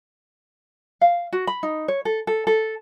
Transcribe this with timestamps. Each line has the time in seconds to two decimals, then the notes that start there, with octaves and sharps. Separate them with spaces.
1.01 F5
1.33 F#4
1.47 B5
1.63 D#4
1.88 C#5
2.05 A4
2.27 A4
2.47 A4